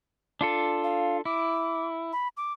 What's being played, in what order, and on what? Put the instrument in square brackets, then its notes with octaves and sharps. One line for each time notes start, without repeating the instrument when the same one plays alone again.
[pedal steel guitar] D4 F4 A4
[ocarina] F5
[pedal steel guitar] E4 [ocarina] D6
[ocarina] B5
D6